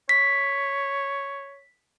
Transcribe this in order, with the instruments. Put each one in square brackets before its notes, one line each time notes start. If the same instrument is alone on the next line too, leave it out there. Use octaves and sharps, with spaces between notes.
[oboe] C#5 [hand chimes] B6